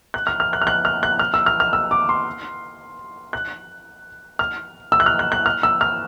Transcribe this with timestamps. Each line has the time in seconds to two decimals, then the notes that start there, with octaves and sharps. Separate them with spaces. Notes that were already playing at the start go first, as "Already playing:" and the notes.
0.14 F#6
0.27 F6
0.40 F6
0.53 F#6
0.62 F6
0.67 F#6
0.85 F6
1.03 F#6
1.19 F6
1.34 E6
1.46 F6
1.60 F6
1.73 E6
1.91 D6
2.09 C6
3.33 F#6
4.39 F6
4.92 E6
5.00 F#6
5.06 F6
5.19 F#6
5.32 F#6
5.46 F6
5.63 E6
5.81 F6